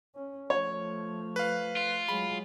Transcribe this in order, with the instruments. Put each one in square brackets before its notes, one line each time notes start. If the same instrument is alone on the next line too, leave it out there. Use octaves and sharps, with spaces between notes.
[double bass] C#4
[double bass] F3 A3 [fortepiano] C#5
[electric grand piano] B4 F5
[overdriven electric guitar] F4
[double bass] F#3 G#3 [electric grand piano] B5